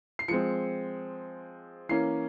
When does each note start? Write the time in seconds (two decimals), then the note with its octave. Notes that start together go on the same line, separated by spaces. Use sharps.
0.19 C7
0.28 F3 G#3 C4 C#7
1.89 E3 A#3 C#4 C7